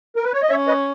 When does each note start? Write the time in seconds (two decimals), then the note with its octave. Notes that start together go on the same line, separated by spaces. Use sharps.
0.16 A#4
0.24 B4
0.33 C#5
0.42 D#5
0.49 C#4 C#5 E5
0.67 B4 D#5